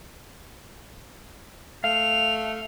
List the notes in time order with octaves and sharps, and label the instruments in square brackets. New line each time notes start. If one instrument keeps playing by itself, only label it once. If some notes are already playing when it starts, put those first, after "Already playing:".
[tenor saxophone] A3 [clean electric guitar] F5 [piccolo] F7